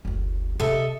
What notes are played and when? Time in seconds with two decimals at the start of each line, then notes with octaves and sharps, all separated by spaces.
0.05 F#1 D2
0.60 C3 D#4 A4 D#5 E5